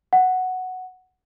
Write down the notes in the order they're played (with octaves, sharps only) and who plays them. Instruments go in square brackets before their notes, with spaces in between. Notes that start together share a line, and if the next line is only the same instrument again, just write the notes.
[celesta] F#5